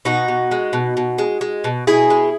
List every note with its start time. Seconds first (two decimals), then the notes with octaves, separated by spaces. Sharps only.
0.05 B2 D#4 F#4
0.28 B2
0.51 G#3
0.73 B2
0.97 B2
1.18 G#3
1.41 G#3
1.64 B2
1.87 B2 E4 G#4
2.10 G#3